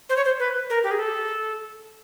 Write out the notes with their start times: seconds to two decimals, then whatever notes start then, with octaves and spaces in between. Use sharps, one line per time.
0.09 C5
0.16 C#5
0.25 C5
0.40 B4
0.70 A#4
0.83 G4
0.91 G#4
0.99 A4